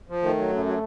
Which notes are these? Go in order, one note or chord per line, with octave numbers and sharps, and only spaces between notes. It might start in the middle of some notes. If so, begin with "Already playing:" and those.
F3
D#3 A3
F#3
F#2
F#3